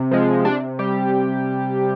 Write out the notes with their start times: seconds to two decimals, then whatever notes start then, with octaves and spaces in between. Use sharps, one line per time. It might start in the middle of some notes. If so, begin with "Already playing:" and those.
Already playing: C3
0.11 F3 G#3
0.45 C3 D4
0.79 G3 G4